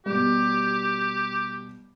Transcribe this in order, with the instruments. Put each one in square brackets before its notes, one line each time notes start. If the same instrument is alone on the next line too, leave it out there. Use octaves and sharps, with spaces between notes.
[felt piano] B2 G3 [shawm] G4